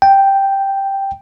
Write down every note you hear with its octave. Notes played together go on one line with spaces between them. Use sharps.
G5